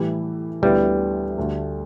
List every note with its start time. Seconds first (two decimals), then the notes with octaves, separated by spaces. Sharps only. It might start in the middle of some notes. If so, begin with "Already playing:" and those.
Already playing: A2 E3 G3 E4 G4
0.62 D2 D3 G3 B3 E4 B4
1.37 D2 D3 A3